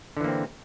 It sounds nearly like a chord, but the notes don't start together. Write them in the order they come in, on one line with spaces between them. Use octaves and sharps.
D3 E3 A#3 C4